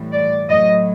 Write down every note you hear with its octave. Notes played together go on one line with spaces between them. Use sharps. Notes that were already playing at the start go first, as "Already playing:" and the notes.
Already playing: A2 E3 G3
D5
A2 F#3 D#5